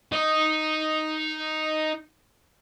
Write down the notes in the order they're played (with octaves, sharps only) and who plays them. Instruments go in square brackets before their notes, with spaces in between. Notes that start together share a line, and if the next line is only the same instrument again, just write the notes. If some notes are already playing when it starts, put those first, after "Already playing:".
[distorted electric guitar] D#4 D#5